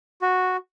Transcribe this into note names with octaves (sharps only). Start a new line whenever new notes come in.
F#4